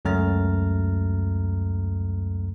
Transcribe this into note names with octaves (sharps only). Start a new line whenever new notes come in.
C#2 F#2 A3 A#5 F6 A6